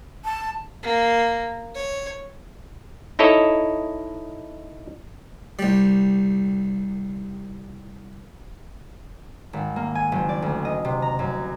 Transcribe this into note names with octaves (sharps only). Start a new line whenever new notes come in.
A5
A#3
C#5
D#4 E4 A4 C#5 D#5
C2 G3
G#1
A#3
G#5
F#1
D5
D2
D#5
C3
A#5
F#2